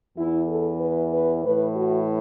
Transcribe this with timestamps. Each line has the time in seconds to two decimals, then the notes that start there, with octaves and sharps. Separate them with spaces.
0.16 E2 E3 E4
0.49 A4
0.80 B4
1.12 B4
1.44 A2 E3 B4
1.75 F#4